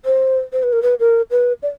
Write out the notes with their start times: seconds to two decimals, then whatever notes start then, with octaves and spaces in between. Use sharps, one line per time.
0.05 C5
0.53 C5
0.63 B4
0.73 A#4
0.82 B4
1.00 A#4
1.31 B4
1.63 D5